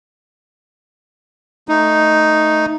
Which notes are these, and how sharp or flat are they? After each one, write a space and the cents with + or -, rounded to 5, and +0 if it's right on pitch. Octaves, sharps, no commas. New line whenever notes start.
A3 +5 D#4 +0